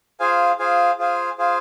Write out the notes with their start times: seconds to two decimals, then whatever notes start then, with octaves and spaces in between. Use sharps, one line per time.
0.20 F4 G#4 C5 F5 G#5
0.59 F4 G#4 C5 F5 G#5
0.99 F4 G#4 C5 F5 G#5
1.38 F4 G#4 C5 F5 G#5